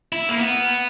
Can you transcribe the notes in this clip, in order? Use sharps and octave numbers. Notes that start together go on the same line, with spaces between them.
E4
A#3
B3